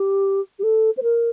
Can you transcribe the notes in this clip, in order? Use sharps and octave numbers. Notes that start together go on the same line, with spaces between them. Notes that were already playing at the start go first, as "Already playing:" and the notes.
Already playing: G4
G4
A4
C5
A#4